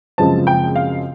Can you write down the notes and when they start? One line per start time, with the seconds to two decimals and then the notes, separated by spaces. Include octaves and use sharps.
0.18 F#2 C#3 F3 G#3 C4 A5
0.47 G5
0.76 F5